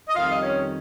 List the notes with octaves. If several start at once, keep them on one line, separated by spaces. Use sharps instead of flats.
D#5
F2 D#3 G3 F4 F5
D#5
C#4 C#5